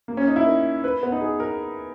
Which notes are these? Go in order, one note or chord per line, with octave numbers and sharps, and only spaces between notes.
A#3
C#4
D#4
E4
A#4
B4
B3
D#4
G#4
A#4